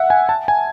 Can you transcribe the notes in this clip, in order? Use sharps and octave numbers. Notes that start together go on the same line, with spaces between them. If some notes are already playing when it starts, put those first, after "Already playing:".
Already playing: E5 F#5
G#5
A5
G#5